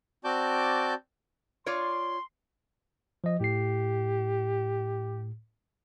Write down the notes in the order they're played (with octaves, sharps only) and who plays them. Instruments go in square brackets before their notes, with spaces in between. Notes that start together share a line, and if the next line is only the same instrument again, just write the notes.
[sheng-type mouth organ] C4 F#4 D5 A5 D6 G6
[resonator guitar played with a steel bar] F4 C#5 D5 [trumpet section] C6
[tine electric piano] F3 D#5
[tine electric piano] A2 C7 [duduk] G4